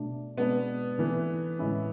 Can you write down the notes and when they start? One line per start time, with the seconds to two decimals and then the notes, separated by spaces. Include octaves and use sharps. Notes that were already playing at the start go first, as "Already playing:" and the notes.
Already playing: B2 A3 D4
0.37 B2 G#3 B3 D4
0.98 D3 E3 A3 E4
1.59 A2 G#3 C#4 E4